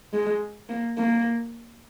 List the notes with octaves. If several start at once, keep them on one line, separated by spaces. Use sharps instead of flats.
G#3
A#3
A#3